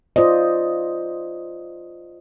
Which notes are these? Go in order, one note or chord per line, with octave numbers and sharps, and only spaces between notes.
F4 C5 D5 D#5